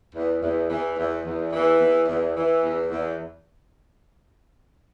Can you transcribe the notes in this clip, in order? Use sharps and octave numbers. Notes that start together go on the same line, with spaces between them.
E2
E2
E2 E3
E2
E2
E2 E3
E2
E2
E3
E2
E2